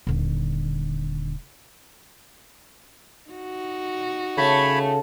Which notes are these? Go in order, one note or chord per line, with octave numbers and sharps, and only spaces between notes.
D#1 D3
D#4 F#4
C#3 A3 C#5 B5